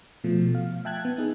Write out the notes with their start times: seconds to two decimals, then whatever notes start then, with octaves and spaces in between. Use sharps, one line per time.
0.24 B2 F3 A3
0.55 F5
0.85 E5 G5 A5 F#6 G#6
1.05 B3
1.18 D#4 G#4